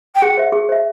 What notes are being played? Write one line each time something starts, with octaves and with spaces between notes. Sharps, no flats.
G5
G#4 F#5
C5 E5
G#4
C5 E5